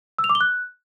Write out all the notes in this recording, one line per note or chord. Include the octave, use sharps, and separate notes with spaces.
E6
F7
D6
G7
F#6